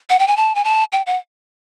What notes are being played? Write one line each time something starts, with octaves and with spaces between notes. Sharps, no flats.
F#5
G5
G#5
A5
G#5
A5
G5
F#5